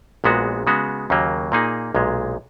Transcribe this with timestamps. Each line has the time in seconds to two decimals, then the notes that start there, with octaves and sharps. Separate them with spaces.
0.24 A#1 A#2 G#3 B3 F#4
0.67 C#3 G#3 B3 F#4
1.10 D#2 C#3 F#3 A#3
1.52 A#2 A#3 D#4 G#4
1.95 B1 A#2 G#3